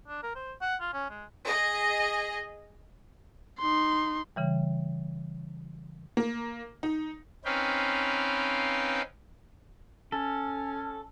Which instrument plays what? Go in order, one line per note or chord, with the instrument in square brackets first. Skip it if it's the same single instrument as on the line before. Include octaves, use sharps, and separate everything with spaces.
[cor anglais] D4
A#4
C5
F#5
F4
C#4
G#3
[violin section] G#4 D#5
[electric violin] D#4 C6
[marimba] C#3 E3 G3
[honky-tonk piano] A#3
D#4
[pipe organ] C4 C#4 D#4 B4 F5 G5
[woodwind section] C#4 [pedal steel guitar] A4